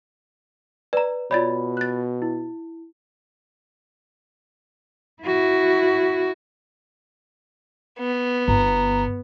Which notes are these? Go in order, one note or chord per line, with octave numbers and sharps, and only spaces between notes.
B4 D5 A#5
B2 F4 C#5 D5 B5 A6
F#6 A6
E4
E4 F#4
B3
G1 A#5